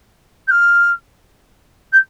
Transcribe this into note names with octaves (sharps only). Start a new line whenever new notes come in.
G6
F6
G6